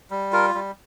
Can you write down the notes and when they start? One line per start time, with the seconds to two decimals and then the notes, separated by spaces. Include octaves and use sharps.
0.11 G3
0.33 F4 A#4
0.54 G3